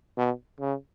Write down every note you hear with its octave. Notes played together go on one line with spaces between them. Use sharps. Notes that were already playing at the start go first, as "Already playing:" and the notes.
B2
C#3